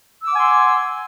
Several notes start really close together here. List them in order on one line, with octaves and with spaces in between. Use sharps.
E6 D6 F#5 G#5 C6